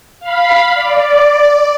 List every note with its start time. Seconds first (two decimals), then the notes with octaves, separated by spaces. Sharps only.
0.20 F5 B5
0.74 D5